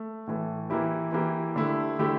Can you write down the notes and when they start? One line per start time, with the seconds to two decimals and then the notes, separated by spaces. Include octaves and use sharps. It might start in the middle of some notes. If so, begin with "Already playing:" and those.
Already playing: A3
0.27 A2 E3 A3
0.70 E3 A#3 E4 G4
1.13 E3 A#3 E4 G4
1.56 D3 A3 E4 G4
1.99 D3 A3 E4 G4